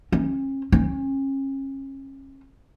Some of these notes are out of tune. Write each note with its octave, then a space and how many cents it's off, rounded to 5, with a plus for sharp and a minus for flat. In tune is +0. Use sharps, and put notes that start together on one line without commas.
C#4 -40
C#4 -35